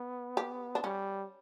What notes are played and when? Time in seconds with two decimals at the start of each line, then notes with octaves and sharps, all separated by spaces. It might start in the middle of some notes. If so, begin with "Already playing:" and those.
Already playing: B3
0.37 G4
0.75 D4
0.84 G3 C#4